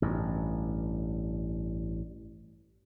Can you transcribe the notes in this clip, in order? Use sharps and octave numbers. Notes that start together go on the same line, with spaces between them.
A1 G2